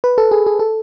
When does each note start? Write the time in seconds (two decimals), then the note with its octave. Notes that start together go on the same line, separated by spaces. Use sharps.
0.04 B4
0.18 A4
0.31 G#4
0.47 G#4
0.59 A4